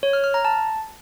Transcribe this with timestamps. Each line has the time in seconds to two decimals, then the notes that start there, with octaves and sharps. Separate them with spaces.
0.03 C#5
0.13 F6
0.24 F6
0.34 A#5
0.45 A5